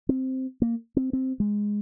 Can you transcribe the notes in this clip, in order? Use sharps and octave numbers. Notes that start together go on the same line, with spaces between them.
C4
A#3
C4
C4
G#3